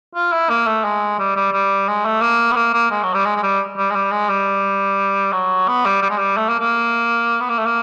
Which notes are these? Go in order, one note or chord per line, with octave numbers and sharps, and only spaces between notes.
F4
E4
A#3
A3
G#3
G3
G3
G3
G#3
A3
A#3
B3
A#3
A#3
G#3
F#3
G3
G#3
G#3
G3
G3
G#3
G3
G#3
G3
F#3
B3
G3
G3
G#3
G3
A3
A#3
A#3
B3
A#3
A3
A#3